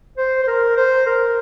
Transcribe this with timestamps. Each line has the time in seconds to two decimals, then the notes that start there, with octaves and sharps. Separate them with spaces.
0.17 C5
0.43 C5
0.47 A#4
0.77 C5
1.06 A#4